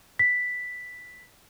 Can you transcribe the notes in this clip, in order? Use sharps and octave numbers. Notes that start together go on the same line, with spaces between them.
B6